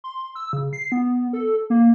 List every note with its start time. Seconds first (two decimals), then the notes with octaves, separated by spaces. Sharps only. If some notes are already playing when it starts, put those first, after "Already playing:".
0.04 C6
0.35 E6
0.53 C#3
0.73 C7
0.92 B3
1.33 A4
1.70 A#3